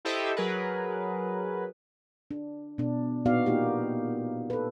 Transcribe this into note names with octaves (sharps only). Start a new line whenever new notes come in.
E4 G4 A4 C5 D#5 E5
F#3 G#4 A#4 B4
D4
B2 D4
A#2 B3 D#4 F#4 D5 F5
A#3 D#4 F4 G4
A4 B4